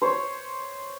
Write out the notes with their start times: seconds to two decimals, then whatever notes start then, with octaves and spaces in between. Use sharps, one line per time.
0.02 C5 C#5